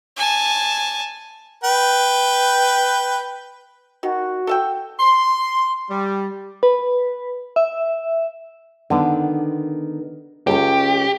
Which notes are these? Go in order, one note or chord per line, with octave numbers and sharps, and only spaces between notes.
G#5 A5
B4 G5
D#3 F#4
A4 E5 G5
C6
G3
B4
E5
D3 D#3 B3 D4
C#2 C#4 G4 A4 F5